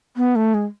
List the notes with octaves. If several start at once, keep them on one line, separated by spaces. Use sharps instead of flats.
B3
A3
G#3